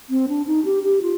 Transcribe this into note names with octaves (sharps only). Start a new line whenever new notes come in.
C4
D4
D#4
G4
G4
F4